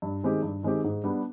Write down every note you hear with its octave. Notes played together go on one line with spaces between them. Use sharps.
G2
D#3 G#3 C4 G4
G2
D#3 G#3 C4 G4
G#2
G3 B3 D4